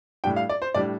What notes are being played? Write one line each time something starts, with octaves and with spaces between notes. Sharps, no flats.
A2 G3 D4 G5
F5
D5
C5
A2 G3 D4 D5